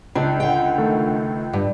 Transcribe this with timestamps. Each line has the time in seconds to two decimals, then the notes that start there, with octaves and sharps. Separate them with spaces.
0.15 C#2 D4
0.40 D3 G5
0.78 D#3 A3 A4
1.53 G2